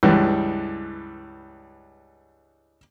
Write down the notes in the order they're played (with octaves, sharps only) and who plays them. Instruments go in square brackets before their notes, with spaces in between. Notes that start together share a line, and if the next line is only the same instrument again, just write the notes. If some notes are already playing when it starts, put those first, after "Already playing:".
[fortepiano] C#2 G2 E3